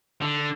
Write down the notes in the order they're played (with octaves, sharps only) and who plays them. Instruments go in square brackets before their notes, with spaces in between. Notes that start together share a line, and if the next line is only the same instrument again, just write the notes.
[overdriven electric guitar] D3